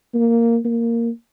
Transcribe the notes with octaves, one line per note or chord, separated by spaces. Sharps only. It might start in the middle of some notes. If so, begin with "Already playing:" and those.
A#3
A#3